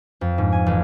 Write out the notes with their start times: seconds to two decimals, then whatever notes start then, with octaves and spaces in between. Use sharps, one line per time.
0.21 F2
0.38 G#2
0.52 G#5
0.67 A1